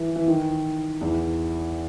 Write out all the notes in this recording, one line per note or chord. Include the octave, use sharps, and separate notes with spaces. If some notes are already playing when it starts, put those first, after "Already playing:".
Already playing: E3
E3
D#3
E2